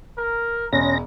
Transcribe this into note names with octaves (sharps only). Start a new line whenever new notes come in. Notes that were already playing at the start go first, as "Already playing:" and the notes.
A#4
E1 G#3 C#4 A#6